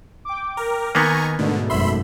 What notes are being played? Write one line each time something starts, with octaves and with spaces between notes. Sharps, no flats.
G5 D6
A#4
D#3 A#3 B3 G#5 A#5 C#6
G#2 B2 D3 A3
G#1 F#2 E5 B5 C6